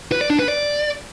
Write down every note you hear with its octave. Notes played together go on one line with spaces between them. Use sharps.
B4
D5
D4
B4
D5